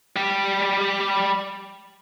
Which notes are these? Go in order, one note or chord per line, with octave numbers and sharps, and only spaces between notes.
G3 G4